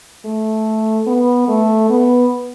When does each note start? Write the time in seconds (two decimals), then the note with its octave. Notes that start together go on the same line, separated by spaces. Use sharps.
0.25 A3
1.07 B3
1.48 A3
1.90 B3